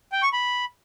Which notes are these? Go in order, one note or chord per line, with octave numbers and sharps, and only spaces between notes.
G5
C#6
B5